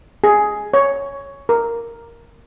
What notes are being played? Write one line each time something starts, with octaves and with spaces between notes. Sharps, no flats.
G#4
C#5
A#4